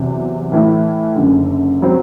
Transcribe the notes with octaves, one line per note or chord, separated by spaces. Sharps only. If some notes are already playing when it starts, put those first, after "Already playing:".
Already playing: E2 C3 F#3
A2 E3 A3 E4
F#1 F#2 D3
F#3 C4